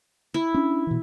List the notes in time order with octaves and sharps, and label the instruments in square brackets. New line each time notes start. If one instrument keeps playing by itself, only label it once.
[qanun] E4
[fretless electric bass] C#4 D4
B2 E3